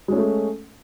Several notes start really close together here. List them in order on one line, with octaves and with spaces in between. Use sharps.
G#3 C#4 A3